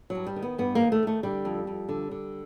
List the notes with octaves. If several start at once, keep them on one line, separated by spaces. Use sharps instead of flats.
G2 F#3
G3
D#3
B3
G2 B3
A#3
D#3
A3
D#3 A3
D3 G3
F2
F2
D3
D3